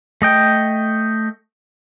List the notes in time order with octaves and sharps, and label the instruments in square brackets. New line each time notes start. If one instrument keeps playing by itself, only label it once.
[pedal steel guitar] A3 D#5 G5